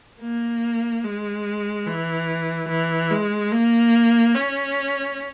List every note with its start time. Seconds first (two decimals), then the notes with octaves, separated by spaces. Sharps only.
0.21 A#3
1.04 G#3
1.87 E3
2.69 E3
3.11 G#3
3.52 A#3
4.35 C#4